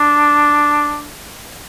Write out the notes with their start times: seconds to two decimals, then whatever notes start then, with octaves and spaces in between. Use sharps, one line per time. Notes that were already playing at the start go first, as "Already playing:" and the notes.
Already playing: D4